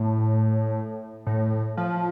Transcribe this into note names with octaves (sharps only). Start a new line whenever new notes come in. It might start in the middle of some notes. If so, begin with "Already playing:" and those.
Already playing: A2
A2
F3